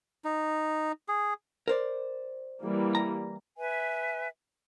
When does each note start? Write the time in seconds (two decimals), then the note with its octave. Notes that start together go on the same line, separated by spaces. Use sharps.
0.24 D#4
1.08 G#4
1.68 A#4 C5 D5
2.60 E3 G3 A#3
2.95 A#5
3.58 B4 E5 G#5